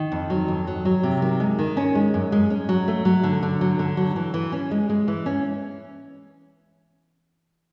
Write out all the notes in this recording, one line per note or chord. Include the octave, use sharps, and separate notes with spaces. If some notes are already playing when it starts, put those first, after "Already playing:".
Already playing: D#3
F2
F#3
F2
F#3
F#3
C3
D#3
G#3
D#3
C#4
G#3
F#2
G#3
C#4
F#3
A3
F#3
D3
D3
F#3
D3
F#3
E3
E3
C#4
G#3
G#3
E3
C#4